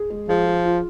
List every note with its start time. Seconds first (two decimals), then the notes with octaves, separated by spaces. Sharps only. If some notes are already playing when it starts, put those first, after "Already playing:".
Already playing: G#4
0.10 G#3
0.29 F3 G#4
0.47 G#4
0.65 F4